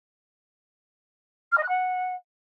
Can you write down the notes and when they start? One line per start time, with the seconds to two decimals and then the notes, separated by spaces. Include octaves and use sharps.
1.52 F6
1.57 D#5
1.63 F#6
1.68 F#5